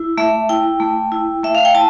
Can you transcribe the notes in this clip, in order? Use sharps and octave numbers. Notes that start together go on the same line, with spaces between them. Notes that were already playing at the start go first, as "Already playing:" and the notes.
Already playing: E4
A3 E5
E4 G5
A3
E4
A3 E5
F5
G5
E4 A5